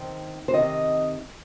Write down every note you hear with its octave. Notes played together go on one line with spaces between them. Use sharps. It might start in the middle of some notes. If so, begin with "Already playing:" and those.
Already playing: C3 D#3 C4
C5
C3 D#3 C4 D#5